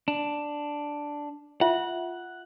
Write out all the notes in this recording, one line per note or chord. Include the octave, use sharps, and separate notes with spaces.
D4
F4 E5 F#5